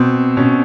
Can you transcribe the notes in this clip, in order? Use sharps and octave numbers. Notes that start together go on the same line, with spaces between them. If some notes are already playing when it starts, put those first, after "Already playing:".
Already playing: B2 C4
B2 C#4